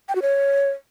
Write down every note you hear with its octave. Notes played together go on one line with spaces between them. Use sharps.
G5
F#4
C#5